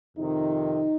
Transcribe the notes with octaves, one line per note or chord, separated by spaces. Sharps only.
F2 C3 D#3 D#4